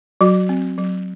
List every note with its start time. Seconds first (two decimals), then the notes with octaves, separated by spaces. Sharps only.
0.21 F#3 F#4
0.49 C4
0.78 F#3